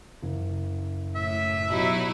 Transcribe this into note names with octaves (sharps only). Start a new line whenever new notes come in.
F#1
A2 E5
B2 F#3 D#4 E4 G4